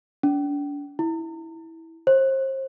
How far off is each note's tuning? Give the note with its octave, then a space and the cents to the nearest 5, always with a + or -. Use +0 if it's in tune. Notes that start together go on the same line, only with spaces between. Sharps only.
D4 -35
E4 -15
C5 +35